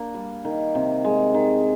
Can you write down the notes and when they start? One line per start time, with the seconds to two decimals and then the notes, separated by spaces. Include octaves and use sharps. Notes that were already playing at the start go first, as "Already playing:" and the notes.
Already playing: A#3 D4
0.14 G3
0.45 D#3
0.75 C3
1.04 G#3
1.34 D#3